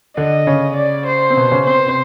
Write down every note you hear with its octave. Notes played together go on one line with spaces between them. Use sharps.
D3 D4 D#5
C#3 C#4
D5
C5
C4
B2 B3
C#3 C#4
C4 C5
B3
C3 C4